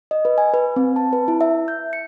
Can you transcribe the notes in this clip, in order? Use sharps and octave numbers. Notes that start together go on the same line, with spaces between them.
D#5
B4
G#5
B4
C4
A5
B4
E4
E5
G6
C#7